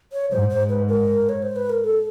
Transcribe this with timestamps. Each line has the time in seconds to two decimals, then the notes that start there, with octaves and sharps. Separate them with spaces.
0.13 C#5
0.31 G#2 C5
0.50 C5
0.69 B4
0.88 A#4
1.29 C#5
1.43 C5
1.56 B4
1.70 A#4
1.84 A4